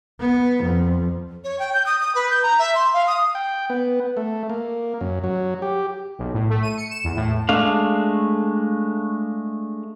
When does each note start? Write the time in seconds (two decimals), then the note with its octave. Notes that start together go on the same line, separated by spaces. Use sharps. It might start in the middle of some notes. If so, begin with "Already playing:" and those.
0.20 B3
0.64 F2
1.44 C#5
1.59 G5
1.73 G6
1.86 D#6
2.00 D#6
2.15 B4
2.30 G6
2.43 A#5
2.59 E5
2.75 C6
2.93 F5
3.07 D#6
3.35 G5
3.70 B3
4.17 A3
4.50 A#3
5.01 F#2
5.24 F#3
5.62 G4
6.19 B1
6.34 A2
6.50 A3
6.63 D#7
6.77 C#7
6.90 E7
7.04 E2
7.16 A2
7.49 G#3 A3 D4 F5